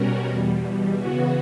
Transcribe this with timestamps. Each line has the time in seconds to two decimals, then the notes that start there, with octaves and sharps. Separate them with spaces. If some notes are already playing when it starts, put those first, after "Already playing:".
Already playing: B2 G3 C#4 F#4 A#4
0.26 E2 B2 G3
0.92 C#3 E3 B3 F#4